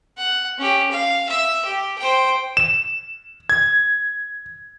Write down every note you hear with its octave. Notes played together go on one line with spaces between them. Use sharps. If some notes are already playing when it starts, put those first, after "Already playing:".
F#5
C#4 G4
F5
E5
G4
C5 G5
E7
G#6